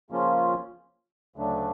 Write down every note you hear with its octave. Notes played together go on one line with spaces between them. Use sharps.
C#3 F3 A#3 C#4 F4
D2 C#3 F#3 A3 D4